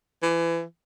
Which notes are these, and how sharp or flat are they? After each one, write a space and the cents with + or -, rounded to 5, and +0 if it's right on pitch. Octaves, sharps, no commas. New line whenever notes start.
E3 +30